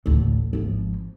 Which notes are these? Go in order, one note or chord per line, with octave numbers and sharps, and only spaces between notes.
A1 D2
G#1 F3